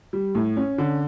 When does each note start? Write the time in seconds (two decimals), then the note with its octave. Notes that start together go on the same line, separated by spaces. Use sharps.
0.13 G3
0.35 A2
0.57 C#4
0.78 D3